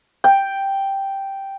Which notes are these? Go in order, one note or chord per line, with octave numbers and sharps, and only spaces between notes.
G5